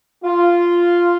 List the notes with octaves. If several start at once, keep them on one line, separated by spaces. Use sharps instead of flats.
F4